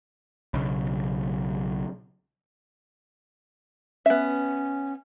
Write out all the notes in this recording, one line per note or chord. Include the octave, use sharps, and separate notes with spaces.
B1 C#3
B3 C#4 E5